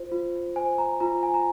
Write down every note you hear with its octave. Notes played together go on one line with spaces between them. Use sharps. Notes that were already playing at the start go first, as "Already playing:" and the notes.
Already playing: F4 C5
F4
C5 G#5
A#5
F4 A#5
G#5
A#5